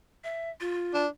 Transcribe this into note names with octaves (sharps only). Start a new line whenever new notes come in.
E5
F4
D4